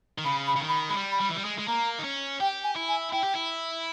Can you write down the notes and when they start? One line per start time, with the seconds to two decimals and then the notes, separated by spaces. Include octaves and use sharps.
0.18 D#3
0.25 C#3 B5
0.47 B5
0.56 C#3
0.61 D#3
0.69 B5
0.89 G#3 B5
0.97 G3
1.12 B5
1.21 G3
1.29 E3
1.36 G3
1.45 G#3
1.58 G#3
1.68 A#3 A#5
1.99 D#4
2.04 C#4
2.40 G4 G5
2.64 G#5
2.76 E4
2.88 G#5
3.12 E4 G5
3.24 G4
3.35 E4